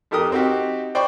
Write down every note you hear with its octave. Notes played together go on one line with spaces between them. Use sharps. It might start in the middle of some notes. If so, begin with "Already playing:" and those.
F2 D#4 G4 A#4 D#5 D#6
C4 D#4 F#4 G4
C5 D5 G5 B5 C#6